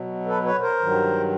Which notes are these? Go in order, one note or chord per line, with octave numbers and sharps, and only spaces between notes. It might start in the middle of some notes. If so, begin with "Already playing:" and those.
Already playing: B2 F#3
A4 B4
B4 C#5
A#4 C5
G2 D#3 F#3